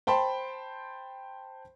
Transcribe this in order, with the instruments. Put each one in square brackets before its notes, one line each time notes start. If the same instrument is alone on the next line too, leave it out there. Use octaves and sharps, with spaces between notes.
[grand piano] C5 G5 A5 B5 C6